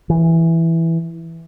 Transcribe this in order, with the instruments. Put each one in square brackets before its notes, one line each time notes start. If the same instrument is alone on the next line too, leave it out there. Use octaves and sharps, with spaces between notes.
[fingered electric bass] E3